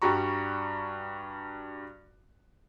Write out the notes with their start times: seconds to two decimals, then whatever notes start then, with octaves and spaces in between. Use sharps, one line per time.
0.02 G2 G3 F#4 A#5 C#6